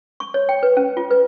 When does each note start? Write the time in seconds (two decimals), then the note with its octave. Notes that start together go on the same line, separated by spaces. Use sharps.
0.20 C#6
0.34 C#5
0.49 G5
0.63 B4
0.77 C#4
0.97 F4
1.11 B4